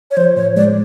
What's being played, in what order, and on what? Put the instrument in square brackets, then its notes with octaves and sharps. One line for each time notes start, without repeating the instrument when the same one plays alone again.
[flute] C#5
[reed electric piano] F3 [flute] C5
[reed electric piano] A2 [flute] C#5
[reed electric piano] G#3 [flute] D5